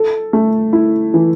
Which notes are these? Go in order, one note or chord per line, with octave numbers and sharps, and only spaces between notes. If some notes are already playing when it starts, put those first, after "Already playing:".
Already playing: A4
A3
E4
E3